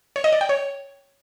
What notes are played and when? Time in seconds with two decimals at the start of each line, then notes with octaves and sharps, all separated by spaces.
0.16 C#5
0.24 D#5
0.33 D5
0.41 G5
0.49 C#5